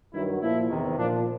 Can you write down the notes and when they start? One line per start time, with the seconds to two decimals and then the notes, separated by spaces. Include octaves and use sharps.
0.13 G2 D#3 F#3 E4
0.41 A#2 F3 E4
0.70 E2 C3 D#3
0.98 A#2 F3 D4